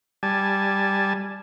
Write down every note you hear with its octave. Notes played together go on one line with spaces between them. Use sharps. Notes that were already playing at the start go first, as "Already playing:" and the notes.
G3 G#5 A5